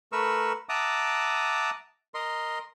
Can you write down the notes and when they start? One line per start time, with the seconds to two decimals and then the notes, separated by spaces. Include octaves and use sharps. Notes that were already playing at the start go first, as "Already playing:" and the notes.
0.12 A3 A#4 B4 C#6 E6
0.69 E5 F#5 A5 A#5 D6 D#6
2.14 A#4 D#5 C6